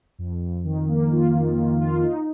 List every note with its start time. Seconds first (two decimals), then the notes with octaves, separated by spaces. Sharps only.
0.19 F2
0.41 F2
0.65 D#3
0.88 A#3
1.12 F4
1.35 D#3
1.57 D#3
1.81 F4
2.03 D#4